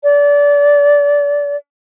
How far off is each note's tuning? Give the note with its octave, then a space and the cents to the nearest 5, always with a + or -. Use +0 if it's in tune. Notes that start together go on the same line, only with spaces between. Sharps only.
D5 -25